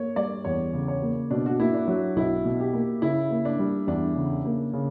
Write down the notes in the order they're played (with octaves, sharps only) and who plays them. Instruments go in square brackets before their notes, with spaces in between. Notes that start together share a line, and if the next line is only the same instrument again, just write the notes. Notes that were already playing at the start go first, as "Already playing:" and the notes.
Already playing: [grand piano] A#3 [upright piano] C#5
[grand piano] G3 [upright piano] D5
[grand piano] E2 [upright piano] C#5
[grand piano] C#3
[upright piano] C#5
[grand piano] A#3
[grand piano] B2 [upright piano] D4
[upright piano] F#4
[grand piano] A#3 [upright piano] E4
[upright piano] D4
[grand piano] F#3
[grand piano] B1 [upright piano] E4
[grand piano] B2
[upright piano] G4
[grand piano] A#3
[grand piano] C#3 [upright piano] E4
[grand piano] A#3
[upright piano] D4
[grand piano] G3
[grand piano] E2 [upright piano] D4
[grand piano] C#3
A#3
C#3